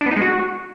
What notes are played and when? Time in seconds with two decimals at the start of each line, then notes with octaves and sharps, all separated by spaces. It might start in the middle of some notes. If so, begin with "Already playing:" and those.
0.01 D4
0.06 B3
0.11 D#4
0.16 G#3
0.21 F#4